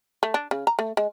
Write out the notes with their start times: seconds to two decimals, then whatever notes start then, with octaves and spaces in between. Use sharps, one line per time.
0.23 A3
0.34 D4
0.51 C#3
0.67 A#5
0.79 A3
0.97 G#3